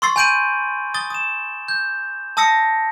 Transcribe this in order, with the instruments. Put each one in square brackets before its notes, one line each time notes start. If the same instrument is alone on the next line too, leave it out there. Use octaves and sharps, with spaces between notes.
[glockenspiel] C6 C#6 E6 A6 C7
G#5 B5 G6 D7 D#7 F#7
D#6 A6 G7
D#6 E7
G6
A5 D#6 E6 A#6 C#7